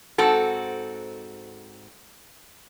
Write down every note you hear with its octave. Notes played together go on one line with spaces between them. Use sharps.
G#2 C4 F#4 A4